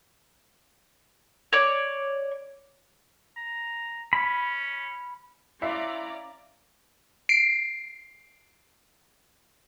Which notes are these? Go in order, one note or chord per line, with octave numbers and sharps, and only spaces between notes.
C#5 D5
A#5
C#4 B5
C#4 E4 D5 E5 F5 A#5 C6
C7 D7